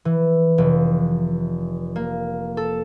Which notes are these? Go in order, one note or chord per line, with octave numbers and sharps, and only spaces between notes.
E3
F1
A#3
A4